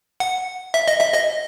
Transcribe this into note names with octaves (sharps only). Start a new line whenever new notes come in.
F#5
E5
D#5
E5
D#5